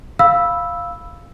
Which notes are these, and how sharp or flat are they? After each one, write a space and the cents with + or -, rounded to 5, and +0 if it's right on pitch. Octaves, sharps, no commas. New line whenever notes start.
F5 -5 B5 +0 E6 +0